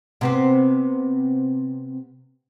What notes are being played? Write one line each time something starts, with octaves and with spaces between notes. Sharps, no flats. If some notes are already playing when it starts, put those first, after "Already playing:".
C3 B3 C4